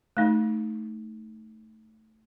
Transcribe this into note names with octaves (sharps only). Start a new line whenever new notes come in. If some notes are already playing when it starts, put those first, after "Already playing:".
A3 D#4